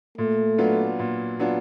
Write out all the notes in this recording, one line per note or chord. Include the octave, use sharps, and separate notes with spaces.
A#2 A3
F#3 B3 D4 F4
A#2
F#3 B3 D4 F4